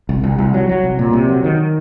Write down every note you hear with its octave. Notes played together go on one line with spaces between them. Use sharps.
C2
C2
C2
F#3
F#3
C2
A#2
C3
F#3
D#3